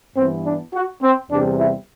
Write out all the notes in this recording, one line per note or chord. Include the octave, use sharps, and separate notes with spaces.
G2 E3 B3 C4
D4
F#4
C4
E2 C3 G3 D4
E4